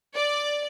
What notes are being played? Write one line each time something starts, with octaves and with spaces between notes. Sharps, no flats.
D5